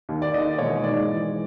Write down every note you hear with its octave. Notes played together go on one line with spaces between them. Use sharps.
D#2
D5
D#3 D#5
E1 C#5
G#2 D5
E3